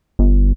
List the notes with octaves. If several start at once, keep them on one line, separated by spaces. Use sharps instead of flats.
G1